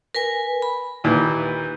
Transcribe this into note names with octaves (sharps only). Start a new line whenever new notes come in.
A#4 B4 G#5
B5
D#2 A#2 E3